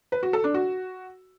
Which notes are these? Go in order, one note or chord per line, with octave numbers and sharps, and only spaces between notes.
B4
F#4
A4
D4
F#4